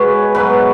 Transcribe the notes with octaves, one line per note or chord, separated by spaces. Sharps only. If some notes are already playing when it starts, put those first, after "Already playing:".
Already playing: B2 G#3 B3 B4 C#5
G#2 F#3 B3 B4